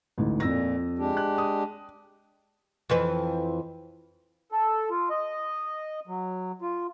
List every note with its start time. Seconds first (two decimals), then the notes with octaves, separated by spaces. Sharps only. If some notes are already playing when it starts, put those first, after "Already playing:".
0.18 A1 D2 G#2
0.40 F2 A#2 E6 A#6
0.99 G#3 D4 G4
1.17 F#6
1.38 D#6
2.90 F2 E3 B4
4.52 A4
4.90 F4
5.10 D#5
6.07 F#3
6.62 F4